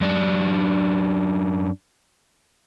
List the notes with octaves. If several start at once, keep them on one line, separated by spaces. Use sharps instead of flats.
F#2 D4